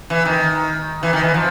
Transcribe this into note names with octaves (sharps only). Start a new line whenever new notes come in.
E3
D#3
E3
D#3
E3
F3